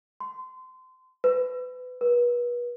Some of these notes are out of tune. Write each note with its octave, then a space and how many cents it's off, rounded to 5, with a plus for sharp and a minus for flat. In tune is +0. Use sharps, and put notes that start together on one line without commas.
C6 -25
B4 +25
B4 -35